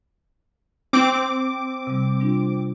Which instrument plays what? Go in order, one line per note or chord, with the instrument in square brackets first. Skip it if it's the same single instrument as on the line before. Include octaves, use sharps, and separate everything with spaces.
[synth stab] C4 D6
[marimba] C3 G3
G3 D4 F4